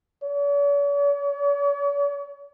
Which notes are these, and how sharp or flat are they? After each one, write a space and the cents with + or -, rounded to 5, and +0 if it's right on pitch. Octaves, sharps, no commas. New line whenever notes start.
C#5 +45